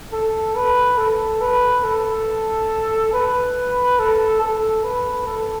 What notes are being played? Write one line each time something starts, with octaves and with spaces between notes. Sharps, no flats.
A4
B4
A4
B4
A4
B4
A4
A4
B4
A4